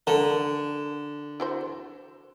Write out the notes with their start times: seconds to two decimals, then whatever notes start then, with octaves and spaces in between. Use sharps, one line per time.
0.07 D3 A4 A#4
1.40 E4 F#4 C5